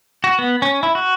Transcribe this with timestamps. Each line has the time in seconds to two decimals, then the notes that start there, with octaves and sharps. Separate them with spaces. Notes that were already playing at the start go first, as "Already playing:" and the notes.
0.24 F#4
0.39 B3
0.62 C#4
0.83 E4
0.95 F#4